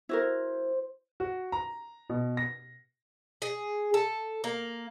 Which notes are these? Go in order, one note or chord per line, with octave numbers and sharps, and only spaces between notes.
E4 F#4 A#4 C5
F#4
A#5
B2
A#6
G#4
A4
A#3